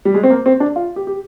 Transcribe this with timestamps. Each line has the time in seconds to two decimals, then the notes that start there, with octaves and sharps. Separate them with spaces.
0.05 G3
0.14 G#3
0.23 C4
0.30 A#3
0.46 C4
0.60 D4
0.76 F4
0.96 G4
1.07 G4